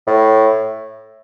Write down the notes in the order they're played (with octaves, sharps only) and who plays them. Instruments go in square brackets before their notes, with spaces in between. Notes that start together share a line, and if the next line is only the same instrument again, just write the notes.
[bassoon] A2